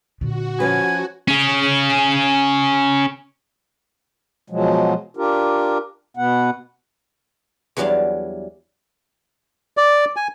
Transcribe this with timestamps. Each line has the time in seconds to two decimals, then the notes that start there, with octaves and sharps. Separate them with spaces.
0.21 A#2 D3 F#4
0.60 F3 C#4 B4 G#5
1.28 C#4 G#4
4.50 B2 F3 F#3 G#3
5.17 D4 F4 G4 A#4
6.17 B2 B3 F#5
7.77 E2 E3 F#3 G3 D4 F5
9.77 D5
10.16 G#5